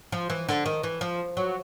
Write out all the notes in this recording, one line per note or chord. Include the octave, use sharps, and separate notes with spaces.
F3
E3
D3
D#3
E3
F3
F#3